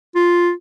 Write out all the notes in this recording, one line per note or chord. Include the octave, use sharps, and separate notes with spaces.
F4